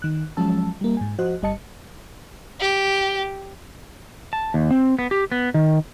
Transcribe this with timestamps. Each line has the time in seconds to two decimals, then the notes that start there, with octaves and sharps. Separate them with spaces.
0.02 D#3 F#6
0.37 F3 F#3 G#3 C#4 A5 E6
0.81 G3 A#3
0.97 G#2 G#5
1.18 F3 F#4 C5 D#5 F#6
1.42 G1 G3 D#5 A5 C#7
2.61 G4
4.33 A5
4.54 D#2
4.71 C4
4.99 B3
5.11 G4
5.32 B3
5.54 D#3